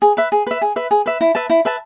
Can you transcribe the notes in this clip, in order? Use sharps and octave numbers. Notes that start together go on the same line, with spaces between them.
G#4
B4 E5
G#4
B4 E5
G#4
B4 E5
G#4
B4 E5
E4
B4 E5 A5
E4
B4 E5 A5